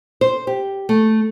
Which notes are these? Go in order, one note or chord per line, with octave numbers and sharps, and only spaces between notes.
C5
G4
A3